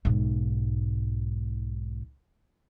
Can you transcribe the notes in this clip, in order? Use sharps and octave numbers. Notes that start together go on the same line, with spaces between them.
B1 G#2